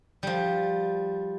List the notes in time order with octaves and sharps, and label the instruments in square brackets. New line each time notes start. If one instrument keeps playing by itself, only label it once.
[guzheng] F3 G3